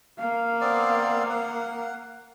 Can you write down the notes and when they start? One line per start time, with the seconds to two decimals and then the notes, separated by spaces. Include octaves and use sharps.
0.19 A#3 F5
0.61 B3 C4 D5
1.29 F#5